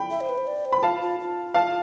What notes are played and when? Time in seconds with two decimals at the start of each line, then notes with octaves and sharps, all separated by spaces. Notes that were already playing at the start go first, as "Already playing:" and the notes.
Already playing: G5 B5
0.11 E5
0.21 C5
0.29 B4
0.38 C5
0.47 D5
0.65 C5
0.72 B5
0.83 F4 F5 A5
1.01 F4
1.20 F4
1.54 F5 A5